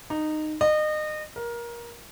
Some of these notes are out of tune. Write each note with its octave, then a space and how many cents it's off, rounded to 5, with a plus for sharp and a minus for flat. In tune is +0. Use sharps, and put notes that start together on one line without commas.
D#4 -15
D#5 -30
A#4 +20